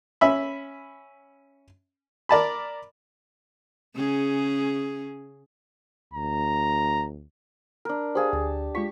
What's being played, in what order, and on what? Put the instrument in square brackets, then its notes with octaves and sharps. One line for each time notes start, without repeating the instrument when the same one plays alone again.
[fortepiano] C#4 E5 B5
A#4 D5 A5 B5
[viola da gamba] C#3 C#4 G#4
[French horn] D2 [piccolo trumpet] A#5
[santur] D4 A#4
[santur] G4 G#4 A5 [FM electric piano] C5 F5
[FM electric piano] D2 [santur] A5
[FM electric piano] G#3 F4 B6 [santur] C#6